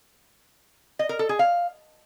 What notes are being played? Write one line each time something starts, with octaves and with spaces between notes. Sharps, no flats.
D#5
A#4
A4
G#4
F5